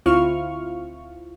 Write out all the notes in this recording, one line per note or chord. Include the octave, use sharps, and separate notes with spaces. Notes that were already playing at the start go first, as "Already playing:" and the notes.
D2 C4 E4 F4 C#6 F6